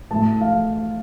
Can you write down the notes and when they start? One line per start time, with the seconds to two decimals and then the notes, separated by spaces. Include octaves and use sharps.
0.11 A2 A3 A5
0.41 F5